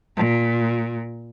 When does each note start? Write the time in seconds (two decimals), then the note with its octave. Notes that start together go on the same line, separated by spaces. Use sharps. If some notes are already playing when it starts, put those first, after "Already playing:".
0.16 A#2